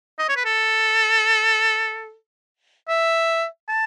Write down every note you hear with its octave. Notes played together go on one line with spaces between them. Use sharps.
D#5
C#5
B4
A4
E5
A5